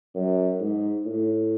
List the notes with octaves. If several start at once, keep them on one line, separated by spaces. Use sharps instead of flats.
F#2
G#2
A2